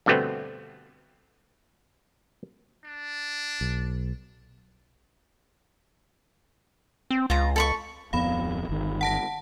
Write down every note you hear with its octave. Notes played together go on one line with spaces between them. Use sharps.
G2 B2 D3 A3 B3 C4
D4
B1
C4
C#2 F4 A#5
A4 B5 C#6
D1 F2 B3 F5 B5
G1 D#3
F#5 A5 A#6